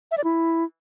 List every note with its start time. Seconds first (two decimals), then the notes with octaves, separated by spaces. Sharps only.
0.11 E5
0.18 D5
0.24 E4